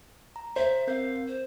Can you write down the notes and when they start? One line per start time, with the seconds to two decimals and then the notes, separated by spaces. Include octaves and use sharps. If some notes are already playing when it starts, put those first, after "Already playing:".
0.36 A#5
0.56 C5 E5
0.87 C4 A#4 F5 G6
1.28 C5